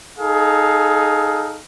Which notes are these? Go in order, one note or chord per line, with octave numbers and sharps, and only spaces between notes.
D#4 G#4 A4 F5